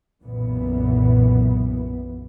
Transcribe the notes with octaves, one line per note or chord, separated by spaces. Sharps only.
B1 F#2 A#2 E3 B3